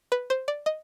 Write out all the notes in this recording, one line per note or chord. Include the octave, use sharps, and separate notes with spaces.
B4
C5
D5
D#5